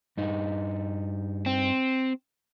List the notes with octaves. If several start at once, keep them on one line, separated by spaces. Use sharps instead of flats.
G2 D#4
C4